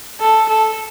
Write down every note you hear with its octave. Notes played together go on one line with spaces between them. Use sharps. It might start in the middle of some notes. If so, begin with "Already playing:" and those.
A4
A4